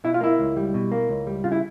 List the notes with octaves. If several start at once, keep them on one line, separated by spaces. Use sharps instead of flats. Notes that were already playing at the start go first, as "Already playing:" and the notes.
B2 E4
F4
A#3 E4
C#2
G3
B2
A#3
C#2
G3
C#3 F4
E4